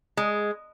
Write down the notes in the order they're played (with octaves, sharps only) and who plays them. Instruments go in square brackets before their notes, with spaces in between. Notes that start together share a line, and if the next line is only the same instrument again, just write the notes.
[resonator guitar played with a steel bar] G#3